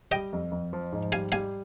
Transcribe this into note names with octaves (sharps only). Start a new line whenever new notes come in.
G3 D#5 G5
F2
F2
F3
G#2
G3 F5 G#5
G3 F5 G#5